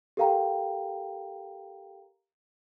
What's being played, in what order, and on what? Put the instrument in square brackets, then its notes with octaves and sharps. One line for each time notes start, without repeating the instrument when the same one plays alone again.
[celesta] G4 A4 A#4 F5 G5 A#5